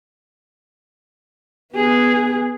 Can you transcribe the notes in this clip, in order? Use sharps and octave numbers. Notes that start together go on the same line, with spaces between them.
B3 G#4